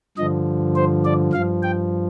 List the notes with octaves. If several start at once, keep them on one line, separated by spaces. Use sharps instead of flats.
G2 D3 F3 D#5
C5
D5
G2 F3 F5
G5